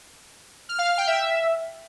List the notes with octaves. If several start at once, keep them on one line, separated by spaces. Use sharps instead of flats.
F6
F5
F6
G5
E5